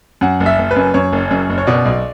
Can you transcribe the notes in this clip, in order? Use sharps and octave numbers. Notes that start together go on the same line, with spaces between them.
F#2 F#5
F#1
E5
F#1
B4
F#2
F#2 C#5
F#1
F#2
F#1
C#5
B2 D5
B1